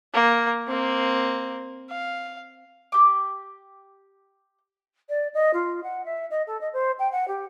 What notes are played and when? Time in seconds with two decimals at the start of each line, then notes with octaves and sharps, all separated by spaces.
0.14 A#3
0.68 A#3 C4
1.90 F5
2.92 G4 D6
5.09 D5
5.34 D#5
5.53 F4
5.83 F#5
6.05 E5
6.30 D#5
6.47 A4
6.61 D#5
6.73 C5
6.99 G5
7.12 F#5
7.28 G4